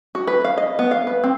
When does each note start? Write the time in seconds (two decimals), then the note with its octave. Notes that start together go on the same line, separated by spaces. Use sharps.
0.15 F#4
0.27 B4
0.44 F5
0.58 D#5
0.79 B3
0.91 F5
1.07 B4
1.24 C4